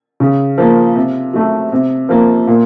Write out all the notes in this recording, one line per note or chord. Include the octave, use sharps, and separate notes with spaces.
C#3
F3 A#3
C3
F#3 A3
C3
F3 A#3
A#2